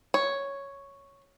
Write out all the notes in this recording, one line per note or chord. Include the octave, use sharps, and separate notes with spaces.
C#5